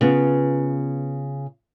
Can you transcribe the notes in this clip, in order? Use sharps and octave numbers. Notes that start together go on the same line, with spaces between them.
C#3 B3 F4